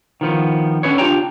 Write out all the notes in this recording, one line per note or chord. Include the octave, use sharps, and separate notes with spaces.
D#3 F3 B3
D3 C#4 G#4 B4 C#5
D4 F4 G4 G5 A#5